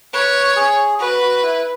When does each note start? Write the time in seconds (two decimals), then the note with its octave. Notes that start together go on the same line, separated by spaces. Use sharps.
0.13 B4 C#5
0.56 G#4
1.00 F#4 B4
1.22 F#4
1.43 E4